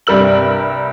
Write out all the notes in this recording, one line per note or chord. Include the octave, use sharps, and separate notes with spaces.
C2 G2 G3 A#4 E6 F#7